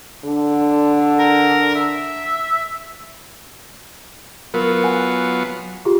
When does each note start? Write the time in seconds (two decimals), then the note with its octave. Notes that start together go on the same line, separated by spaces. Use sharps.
0.24 D3
1.19 A#4
1.75 E5
4.54 F#3 B3 F4 A#4
4.84 F#5 G#5
5.85 F4 G4 G#4